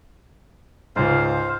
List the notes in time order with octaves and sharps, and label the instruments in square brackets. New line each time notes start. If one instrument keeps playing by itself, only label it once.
[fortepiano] C#2 G#2 [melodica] C5 F5